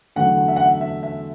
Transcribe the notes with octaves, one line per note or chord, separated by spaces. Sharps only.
E2 D3 F#3 A3 F#5
E5
F#5
E5
E5
E5